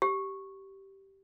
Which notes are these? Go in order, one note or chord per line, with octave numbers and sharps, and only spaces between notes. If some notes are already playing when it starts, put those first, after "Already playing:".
G4